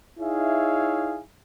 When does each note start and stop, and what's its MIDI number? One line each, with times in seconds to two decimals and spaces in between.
0.20 1.20 63
0.20 1.20 64
0.20 1.20 68
0.20 1.20 73
0.20 1.20 76
0.20 1.20 77